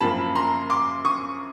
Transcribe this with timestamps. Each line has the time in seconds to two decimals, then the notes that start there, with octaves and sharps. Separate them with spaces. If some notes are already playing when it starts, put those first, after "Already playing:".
0.01 F#2 C#3 F3 A#3 A5 B5
0.35 A#5 C6
0.70 C6 D6
1.05 C#6 D#6